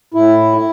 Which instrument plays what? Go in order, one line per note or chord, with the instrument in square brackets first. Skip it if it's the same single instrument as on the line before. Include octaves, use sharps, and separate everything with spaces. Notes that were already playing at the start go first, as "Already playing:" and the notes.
[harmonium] A2 E4
E4